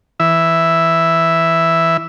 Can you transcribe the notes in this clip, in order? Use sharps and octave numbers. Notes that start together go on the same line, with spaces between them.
E3 E5